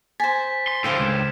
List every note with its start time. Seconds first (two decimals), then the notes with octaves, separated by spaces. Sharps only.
0.20 C5 G#5 A6 B6
0.68 C6
0.84 A2 D3 C5 F5 G5 E6 B6
0.98 C#2 G6 G#6 E7